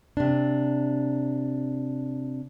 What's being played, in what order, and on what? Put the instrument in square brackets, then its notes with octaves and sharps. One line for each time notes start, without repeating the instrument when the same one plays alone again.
[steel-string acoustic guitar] C3 D4